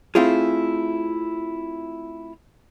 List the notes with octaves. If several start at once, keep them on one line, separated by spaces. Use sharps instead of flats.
A3 C4 E4 F4 G#4